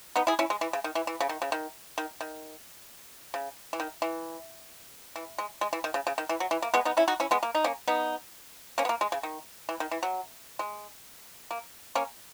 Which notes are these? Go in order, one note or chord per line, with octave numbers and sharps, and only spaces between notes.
B3 D#4
E4 G#4
C#4 E4
G#3
E3
C#3
D#3
E3
E3
C#3
D#3
C#3
D#3
D#3
D#3
C#3
E3
D#3
E3
E3
G#3
G#3
E3
D#3
C#3
C#3
D#3
E3
F#3
E3
A#3
G#3 B3
B3 D#4
C#4 E4
D#4 F#4
C#4 E4
G#3 B3
A#3
D#4
A#3 C#4
B3 D#4
A#3 C#4
B3
A#3
G#3
C#3
D#3
E3
D#3
E3
F#3
G#3
A#3
A#3 C#4